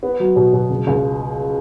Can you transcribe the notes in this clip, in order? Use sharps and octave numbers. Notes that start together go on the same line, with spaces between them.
B3
F#3
B2
B2
C#2
C#2